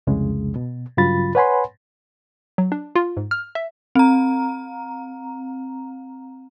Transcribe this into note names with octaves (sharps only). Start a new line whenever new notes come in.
C2 F2 C#3 G#3
B2
G2 C#3 F#3 F4 B5 A6
B4 C#5 F#5 G#5 B5 C6
F#3
D4
F4
G#2
F6
E5
C4 A#5